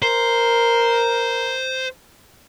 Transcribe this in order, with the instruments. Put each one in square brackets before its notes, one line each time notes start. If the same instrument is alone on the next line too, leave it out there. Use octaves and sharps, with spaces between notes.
[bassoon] A#4 [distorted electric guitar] C5